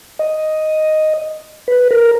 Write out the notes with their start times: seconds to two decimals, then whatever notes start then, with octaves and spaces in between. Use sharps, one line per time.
0.19 D#5
1.68 B4
1.91 A#4